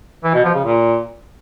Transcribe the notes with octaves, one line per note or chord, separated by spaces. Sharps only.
E3
B2
F3
C#3
A#2